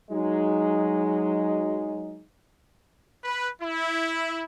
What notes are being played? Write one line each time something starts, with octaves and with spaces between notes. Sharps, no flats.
F#3 G#3 D#4
B4
E4